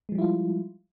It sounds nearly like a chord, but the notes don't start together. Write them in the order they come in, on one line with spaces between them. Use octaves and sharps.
G#3 F3 G3 E4 F4